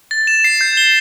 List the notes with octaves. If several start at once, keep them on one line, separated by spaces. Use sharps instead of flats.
A6
E7
C7
G6
G7